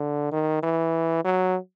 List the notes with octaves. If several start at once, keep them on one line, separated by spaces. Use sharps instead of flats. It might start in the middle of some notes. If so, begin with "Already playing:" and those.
Already playing: D3
D#3
E3
F#3